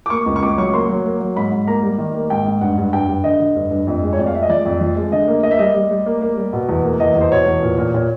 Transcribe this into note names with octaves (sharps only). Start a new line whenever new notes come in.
D6
A#3 C#6
C#2
C#6
C#2 D6
F#3 C#6
A#3 C6
F#3
A#3
F#3
G#2 B5
G#2
A#3 A#5
G3
D#3
A#3
G#2 G5
G#2
G2 F#5
G2
G2 G5
G2
D3 D#5
D3
G2
G2
F2
G#3
C#5
F2 D5
F5
G#3 E5
D#5
F3 D5
F2
F3
G#3
D3 D#5
A#3
A#3 D#5
E5
G3 D#5
G3
G3
A#3
A#3
G3
B2
E2
A#3
E2 D#5
E2
C5
B2 C#5
E2
A#2
A#2
A#2 C#5